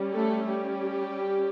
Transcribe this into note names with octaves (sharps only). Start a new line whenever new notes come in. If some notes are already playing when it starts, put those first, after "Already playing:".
Already playing: G3 C#4
A3 A4
G3 G4